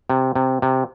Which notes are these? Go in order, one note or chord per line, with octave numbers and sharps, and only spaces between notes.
C3
C3
C3